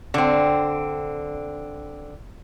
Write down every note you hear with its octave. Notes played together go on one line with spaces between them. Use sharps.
D3 C4